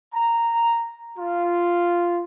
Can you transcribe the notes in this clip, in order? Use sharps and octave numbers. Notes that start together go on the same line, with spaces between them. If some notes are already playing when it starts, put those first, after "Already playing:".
A#5
F4